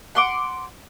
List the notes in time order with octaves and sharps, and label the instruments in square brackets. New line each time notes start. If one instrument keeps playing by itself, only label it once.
[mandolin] F#5 C6 D6